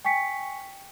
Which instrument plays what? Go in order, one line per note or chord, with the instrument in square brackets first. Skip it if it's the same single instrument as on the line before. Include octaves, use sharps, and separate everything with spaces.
[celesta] G5 G#5 C#6 B6 C#7